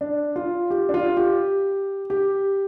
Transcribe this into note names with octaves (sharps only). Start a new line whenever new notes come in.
D4
F4
G4
D4
F4
G4
G4